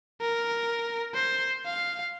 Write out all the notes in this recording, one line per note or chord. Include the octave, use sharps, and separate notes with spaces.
A#4
C5
F5